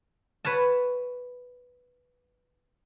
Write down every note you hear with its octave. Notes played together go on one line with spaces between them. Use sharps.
B4 C#5 F#5 A5